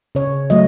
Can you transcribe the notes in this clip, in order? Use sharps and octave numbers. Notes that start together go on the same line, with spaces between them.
C#3 C#5
F#3 A3 D#5